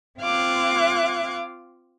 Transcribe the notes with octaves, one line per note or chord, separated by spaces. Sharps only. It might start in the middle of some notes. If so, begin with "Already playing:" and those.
C4 F4 F5 D6 F#6 G#6